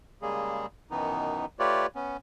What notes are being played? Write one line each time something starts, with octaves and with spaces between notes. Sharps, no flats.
C#3 G3 G#3 A#3 G#4
F#2 B2 D#3 E3 B3 D#4
A3 F4 G4 B4 C#5 D5
B3 C#4